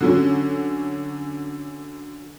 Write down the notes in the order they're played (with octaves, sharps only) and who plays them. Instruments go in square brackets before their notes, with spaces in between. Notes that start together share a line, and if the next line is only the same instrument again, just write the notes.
[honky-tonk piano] D3 F#3 C#4